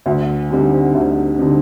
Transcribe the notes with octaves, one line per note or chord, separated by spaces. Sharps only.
D2
D3 G3 C4 D#4
D2
D3 G3 C4 D#4